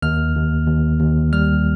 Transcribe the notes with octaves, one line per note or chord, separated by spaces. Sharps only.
D#2 F6
D#2
D#2
D#2
G3 F6